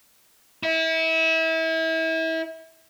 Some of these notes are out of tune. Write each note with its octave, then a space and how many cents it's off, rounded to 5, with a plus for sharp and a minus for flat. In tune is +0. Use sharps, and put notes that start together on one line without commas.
E4 -30